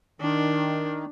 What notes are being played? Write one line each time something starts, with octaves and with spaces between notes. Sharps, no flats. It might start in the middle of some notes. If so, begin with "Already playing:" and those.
D#3 D4